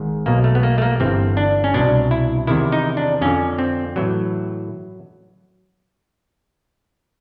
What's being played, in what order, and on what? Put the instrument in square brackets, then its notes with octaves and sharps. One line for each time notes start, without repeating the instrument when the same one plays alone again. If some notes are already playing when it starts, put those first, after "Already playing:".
Already playing: [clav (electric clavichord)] G#1 G#2 D#3
B1 B2 A#3
A3
B3
A#3
A3
A#3
G1 G2 E3 C4
D4
C#4
C2 B2 D4
E4
E2 C3 D#3 E4
D#4
D4
F2 D3 C#4
C4
A2 E3 F#3